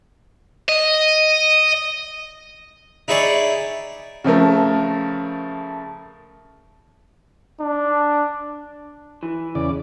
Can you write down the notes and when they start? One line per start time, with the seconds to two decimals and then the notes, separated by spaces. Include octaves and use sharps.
0.69 D#5
3.08 D#4 E4 G#4 C#5 D5
4.24 C#3 F3 A3 A#4
7.60 D4
9.23 E3
9.55 E2 C#3 D5